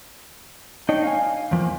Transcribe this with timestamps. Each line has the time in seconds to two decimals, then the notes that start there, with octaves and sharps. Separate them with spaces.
0.89 D4 D#4 C#5 D#5 G5
1.03 F5 G#5
1.51 E2 F3 A#3